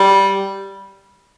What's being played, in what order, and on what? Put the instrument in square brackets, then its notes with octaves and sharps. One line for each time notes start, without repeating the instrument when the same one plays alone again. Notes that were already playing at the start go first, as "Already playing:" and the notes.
Already playing: [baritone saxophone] G3